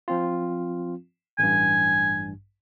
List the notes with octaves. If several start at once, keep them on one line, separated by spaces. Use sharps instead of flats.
F3 C4 F4
A1 G2 G#5